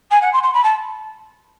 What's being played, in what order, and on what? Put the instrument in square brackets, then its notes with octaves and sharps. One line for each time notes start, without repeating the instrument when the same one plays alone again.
[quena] G#5
F#5
C6
C6
B5
A5